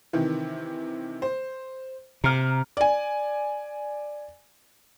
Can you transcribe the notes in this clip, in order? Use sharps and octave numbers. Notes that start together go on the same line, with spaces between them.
C3 D#3 E3
C5
C3 A#5 F6
D5 G#5